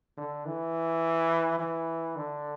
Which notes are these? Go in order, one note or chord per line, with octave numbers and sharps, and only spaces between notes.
D3
E3
E3
D3